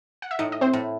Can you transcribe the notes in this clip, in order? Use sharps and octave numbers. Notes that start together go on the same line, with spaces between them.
F#5
E5
A2 D#4 D#5
D#5
C4 C5
A2